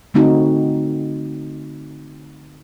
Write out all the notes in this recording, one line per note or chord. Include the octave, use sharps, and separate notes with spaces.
D3 A3 C4 D#4 F#4